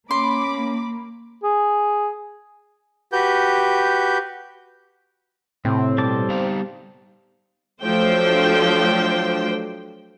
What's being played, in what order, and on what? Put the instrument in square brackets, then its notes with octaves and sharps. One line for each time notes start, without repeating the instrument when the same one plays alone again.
[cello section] A#3 [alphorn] C#4 [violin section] B5 D6 [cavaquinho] C6
[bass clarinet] G#4
[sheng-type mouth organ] F#4 G4 B4 G6
[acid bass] A2 [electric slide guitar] C3 [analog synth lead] C4
[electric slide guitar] B2 [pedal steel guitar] G3 A5 D6
[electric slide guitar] B3 D#4 F5
[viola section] F3 F#3 A3 D4 C5 G5